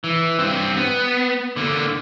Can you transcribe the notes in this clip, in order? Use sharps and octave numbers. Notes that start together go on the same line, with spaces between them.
E3
G2 C4
B3
D3 A#3